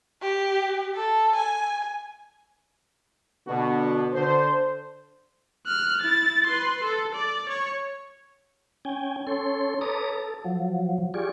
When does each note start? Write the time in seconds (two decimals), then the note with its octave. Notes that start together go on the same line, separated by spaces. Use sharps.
0.22 G4
0.95 A4
1.35 G#5
3.47 B2 D3 B3 D4 F#4
4.13 D3 C5
5.66 F6 F#6
6.01 E4 A6
6.46 B4 C6
6.84 A4
7.15 D5
7.49 C#5
8.85 C#4 G5 G#5
9.27 C#4 A4 C#5 C6
9.81 A4 B4 C#5 A#5 D6 D#6
10.12 A4
10.44 F3 F#3
11.14 F4 G4 G#4 D5 C#6